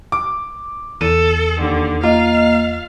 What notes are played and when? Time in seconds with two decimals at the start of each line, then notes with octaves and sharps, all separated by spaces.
0.12 D6
1.01 E2 A4 D#7
1.61 D#2 D3
2.03 A#3 F4 D#5 F5